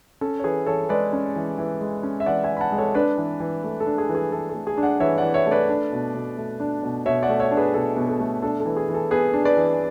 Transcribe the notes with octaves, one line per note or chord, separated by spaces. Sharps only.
C#4 A4
C#5
E3 G#4 B4
E3 A4 C#5
G#3 B4 D5
C#4
E3
E3
G#3
C#4
E5
E3 D5 F#5
E5 G#5
E3
B5
F#5 A5
G#3
A4 C#5
D4 B4 D5
E3
E3
A3
A4
D4
G#4
E3
G#4
E3 A4
A4
A3
G#4
D4
D5 F#5
E3 C#5 E5
D5 F#5
E3
C#5 E5
A3
B4 D5
D4
B2
B2
A3
D4
B2
B2 C#5 E5
D5 F#5
A3
C#5 E5
D4
G#4 B4
B2 A4
B2
A4
A3
D4 A4
A4
E3
G#4
E3
A4
B3 G#4 B4
D4
B4 D5
E3